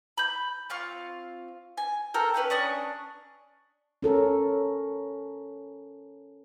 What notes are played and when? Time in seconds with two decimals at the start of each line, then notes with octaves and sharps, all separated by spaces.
0.18 B5 G6
0.70 C4 F4 F5 C#6
1.78 G#5
2.14 A4 A#4 G5
2.34 C#4 B4 F5 G5
2.50 C#4 D4 C#6 D#6
4.02 C#4 A4 A#4